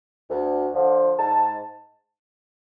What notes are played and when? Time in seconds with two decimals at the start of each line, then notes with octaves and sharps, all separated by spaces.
0.29 D2
0.73 D3 F3
1.18 G#2 A5